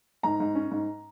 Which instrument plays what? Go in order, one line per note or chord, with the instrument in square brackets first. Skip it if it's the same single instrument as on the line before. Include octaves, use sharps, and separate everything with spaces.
[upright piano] G#2 A#5
G#2
C#4
G#2